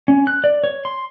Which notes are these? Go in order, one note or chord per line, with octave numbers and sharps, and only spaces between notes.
C#4
F#6
D5
C#5
C6